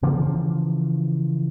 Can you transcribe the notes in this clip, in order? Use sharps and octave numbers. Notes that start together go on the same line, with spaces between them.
C#3 E3 F3 A#3